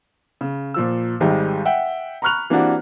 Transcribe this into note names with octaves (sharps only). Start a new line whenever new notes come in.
C#3
A#2 F3 E6
G#1 D#3 G3 G#3
E5 F#5 G5
A#5 B5 C#6 F6 F#6 F7
E3 A#3 C4 D4 F#4 G4